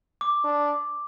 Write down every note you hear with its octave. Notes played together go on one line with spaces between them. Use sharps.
D6
D4